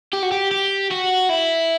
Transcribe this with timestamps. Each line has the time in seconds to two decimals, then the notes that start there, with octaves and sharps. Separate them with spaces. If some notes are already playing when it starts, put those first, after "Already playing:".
0.13 G4
0.23 F#4
0.32 G4
0.51 G4
0.91 F#4
1.30 E4